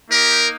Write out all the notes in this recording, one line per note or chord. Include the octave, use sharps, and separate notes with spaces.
A#3 D#4 G4 A#4